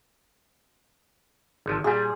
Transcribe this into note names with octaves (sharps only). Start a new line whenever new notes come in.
G#1 D3 F3
A#2 G3 G#4